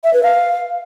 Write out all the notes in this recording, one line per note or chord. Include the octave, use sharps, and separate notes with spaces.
E5
B4
F5